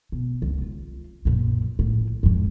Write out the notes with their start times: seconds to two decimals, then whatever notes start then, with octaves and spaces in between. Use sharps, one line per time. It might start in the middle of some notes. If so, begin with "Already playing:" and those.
0.12 B2
0.42 F1 C#2
0.61 F4
1.25 F#2 A#2
1.79 A#1 A2
2.23 F2 G#2